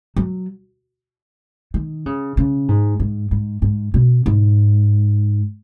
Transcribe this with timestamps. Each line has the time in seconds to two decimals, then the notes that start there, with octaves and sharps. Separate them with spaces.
0.16 F#3
1.74 D#3
2.06 C#3
2.37 C#3
2.68 G#2
3.00 G#2
3.31 G#2
3.62 G#2
3.94 B2
4.26 G#2